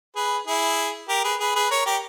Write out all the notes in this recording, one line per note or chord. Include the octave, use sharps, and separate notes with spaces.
G#4 B4
E4 G#4
G4 A#4
G#4 B4
G#4 B4
G#4 B4
A#4 C#5
G4 A#4